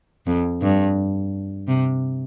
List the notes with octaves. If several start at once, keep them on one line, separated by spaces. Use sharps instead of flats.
F2
G2
C3